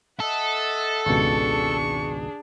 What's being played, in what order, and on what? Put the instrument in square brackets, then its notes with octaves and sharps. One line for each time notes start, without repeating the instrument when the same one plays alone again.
[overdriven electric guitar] A4 [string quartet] D#5 E5 F#5
[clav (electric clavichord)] G#1 C#2 B2 [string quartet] D4 G#4 [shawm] C#6